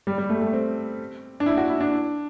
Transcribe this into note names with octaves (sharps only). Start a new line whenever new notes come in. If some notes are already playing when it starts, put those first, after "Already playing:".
G3
G3
A3
A3
C4
D4
E4
F#4
E4
D4